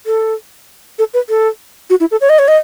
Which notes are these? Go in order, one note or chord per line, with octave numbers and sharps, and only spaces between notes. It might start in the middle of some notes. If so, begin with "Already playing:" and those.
A4
A4
B4
A4
F#4
E4
A4
C#5
D#5
C#5
D#5